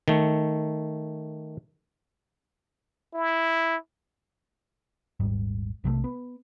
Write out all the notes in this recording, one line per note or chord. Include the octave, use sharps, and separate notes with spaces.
D#3 A3
E4
D#1 G#1 G#2 G3
B1 C3 D#3 A3
B3